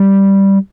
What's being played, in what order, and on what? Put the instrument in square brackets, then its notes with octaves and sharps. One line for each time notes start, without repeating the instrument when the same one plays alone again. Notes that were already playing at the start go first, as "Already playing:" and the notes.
Already playing: [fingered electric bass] G3